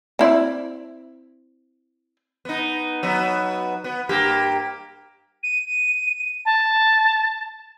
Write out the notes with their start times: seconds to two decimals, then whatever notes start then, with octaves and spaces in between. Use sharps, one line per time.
0.19 C4 E4 D5
2.45 B3 D#4
3.03 F#3 B3 D#4
3.84 B3
4.09 G2 A#3 G4
5.43 D#7
6.45 A5